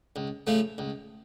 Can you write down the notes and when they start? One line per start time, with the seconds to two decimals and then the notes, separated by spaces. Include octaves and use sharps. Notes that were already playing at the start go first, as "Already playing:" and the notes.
0.16 C#2
0.47 C#3 F3 A3
0.78 C#2